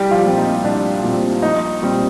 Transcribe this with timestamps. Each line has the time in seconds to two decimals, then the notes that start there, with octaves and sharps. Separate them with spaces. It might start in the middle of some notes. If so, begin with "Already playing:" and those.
Already playing: C2 G3 G4
0.11 F3 F4
0.25 A#2 G3 C4
0.37 D#4
0.64 C2 D4
1.03 A#2 G3 C4
1.42 A#1 D#4
1.82 A#2 G3 C4